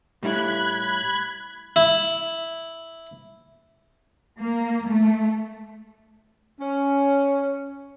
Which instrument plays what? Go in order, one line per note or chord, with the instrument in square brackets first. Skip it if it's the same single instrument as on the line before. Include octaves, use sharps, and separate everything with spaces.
[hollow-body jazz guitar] A2 G3 E4 [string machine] B5 F#6 G#6
[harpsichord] E4
[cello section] A#3
A3
[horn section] C#4